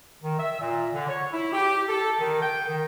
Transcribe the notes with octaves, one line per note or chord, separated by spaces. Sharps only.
D#3
E5
A#2
D3
C#5
E4
G4
A4
D#3
G5
D#3